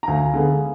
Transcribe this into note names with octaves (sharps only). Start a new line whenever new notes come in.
A#5
D2 F5 G#5
D3 G#3 B3